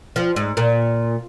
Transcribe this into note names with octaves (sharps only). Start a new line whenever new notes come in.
F3
G#2
A#2